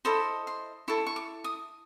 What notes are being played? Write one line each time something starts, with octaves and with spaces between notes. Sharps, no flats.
E4 A4 C5 D#5 B5
C6
E4 A4 C#6
C#6
D6
D#6